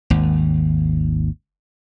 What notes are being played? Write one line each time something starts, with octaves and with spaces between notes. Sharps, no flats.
G#1 D#2